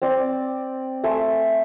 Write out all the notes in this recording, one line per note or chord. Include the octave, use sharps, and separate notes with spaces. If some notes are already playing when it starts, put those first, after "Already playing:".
C4 D5
A3 E5 G#5 C6